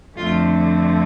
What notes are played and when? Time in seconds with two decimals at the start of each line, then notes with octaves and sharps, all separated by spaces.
0.17 F2 D3 F3 A3 C4 F4